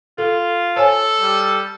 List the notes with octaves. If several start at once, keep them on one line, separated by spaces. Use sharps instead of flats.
F4 A4
A4 C5 C#5 G#5
G3